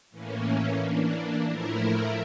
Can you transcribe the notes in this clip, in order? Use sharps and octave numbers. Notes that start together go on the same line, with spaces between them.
A2 E3 A#3 C#4
E3 A#3 D4
A2 F3 A3 E4 A#4